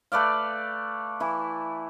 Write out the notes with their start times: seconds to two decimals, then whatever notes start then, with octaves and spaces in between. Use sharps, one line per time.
0.12 A3 B4 D5 F5
1.20 E3 E4